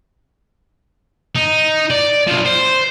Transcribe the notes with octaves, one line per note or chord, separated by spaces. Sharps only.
D#4
D5
B1 F3
C5